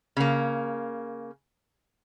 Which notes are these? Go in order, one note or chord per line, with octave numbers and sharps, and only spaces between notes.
C#3 A#3